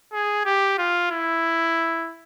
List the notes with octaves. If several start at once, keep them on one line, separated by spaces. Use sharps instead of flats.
G#4
G4
F4
E4